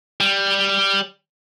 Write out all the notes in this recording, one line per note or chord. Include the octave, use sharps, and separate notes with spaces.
G3